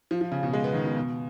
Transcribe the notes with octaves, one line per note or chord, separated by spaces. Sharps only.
F3
F3
C#3
B2
G#3
B3
D#3
B2
B2